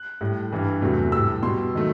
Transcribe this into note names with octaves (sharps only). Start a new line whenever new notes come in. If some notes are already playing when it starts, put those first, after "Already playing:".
Already playing: F#6
A2 G3
G2 E3 G3
E2 C3 F#3 A3
A2 G3 E6
B2 G3 C6
D#3 F#3 A3